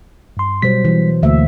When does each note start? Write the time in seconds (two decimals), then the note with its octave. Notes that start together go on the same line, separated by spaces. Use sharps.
0.37 G2 C6
0.62 B2 F#3 G3 C5 B6
0.85 E3
1.22 D2 A#3 E5